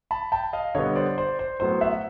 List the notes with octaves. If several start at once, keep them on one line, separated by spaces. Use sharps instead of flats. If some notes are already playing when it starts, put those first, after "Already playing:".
A5 B5
G5 A5
D#5 F5
D3 G3 B3 C#5 D#5
C5 D5
C5 D5
C5
A2 F#3 B3 C5
E5 F#5